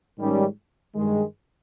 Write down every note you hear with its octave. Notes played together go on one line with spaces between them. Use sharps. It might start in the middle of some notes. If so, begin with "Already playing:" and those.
G#2 D#3 G3 C#4
G2 D#3 G#3